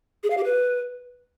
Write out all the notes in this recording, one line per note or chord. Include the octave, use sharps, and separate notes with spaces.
G#4
F5
G4
B4